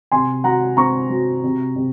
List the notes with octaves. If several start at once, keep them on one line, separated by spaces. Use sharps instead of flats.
C3 G#5 C6
F#3 F#5 A#5
C4 A#5 C#6
F#3
C3
C3